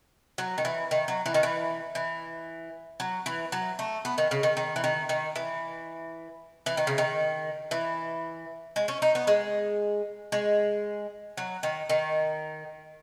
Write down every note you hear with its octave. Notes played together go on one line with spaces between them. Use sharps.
F#3
D#3
E3
D#3
F#3
E3
D#3
E3
E3
F#3
E3
F#3
A3
B3
D#3
C#3
D#3
D#3
E3
D#3
D#3
E3
E3
D#3
C#3
D#3
E3
G#3
C#4
D#4
B3
G#3
G#3
F#3
D#3
D#3